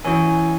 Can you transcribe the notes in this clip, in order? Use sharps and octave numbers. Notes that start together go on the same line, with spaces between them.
E3 C#4 F#4 C#5 G#5